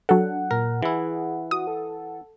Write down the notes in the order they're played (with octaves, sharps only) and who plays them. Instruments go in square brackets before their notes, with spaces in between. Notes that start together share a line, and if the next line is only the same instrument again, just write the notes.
[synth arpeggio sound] F#3 A4 [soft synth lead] D4 [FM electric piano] F#5
[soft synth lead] A#2 [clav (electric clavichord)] A#4
[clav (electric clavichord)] E3 E4 [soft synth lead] G#4
[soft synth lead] F#4 [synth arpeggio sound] D#6
[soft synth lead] A4